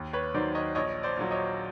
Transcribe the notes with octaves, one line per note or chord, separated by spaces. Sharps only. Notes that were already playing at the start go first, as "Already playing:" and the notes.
Already playing: D#2
B4 C#5
D#3 F#3 C5 D5
C#5 D#5
A#1 C#5 D#5
C5 D5
A#2 F#3
C#5 D#5